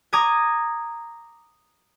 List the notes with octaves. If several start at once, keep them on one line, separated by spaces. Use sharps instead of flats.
A#5 D6 D#6 G#6